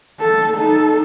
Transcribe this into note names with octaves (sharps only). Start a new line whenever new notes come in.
A4
D#4 A4